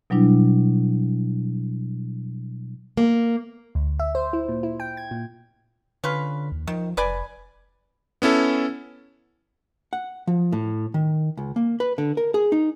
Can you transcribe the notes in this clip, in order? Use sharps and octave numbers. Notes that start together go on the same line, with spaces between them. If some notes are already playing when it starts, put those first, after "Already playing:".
B2 F#3 G3 D4 E4
A#3
D2
E5
C5
E4
A#2
E4
G5
G#6
A#2
D3 C#4 F4 B4
D#2
D#3 F3
F1 B4 D5 G#5
B3 C#4 E4 A4
F#5
F3
A2
D#3
C#2
A#3
B4
D3
A#4
G#4
D#4